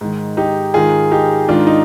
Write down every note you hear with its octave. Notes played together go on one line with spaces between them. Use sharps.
G#2 D#3
D#4 G4
G#2 D#3 F4 G#4
D#4 G4
G#2 D#3 D4 F4
D#4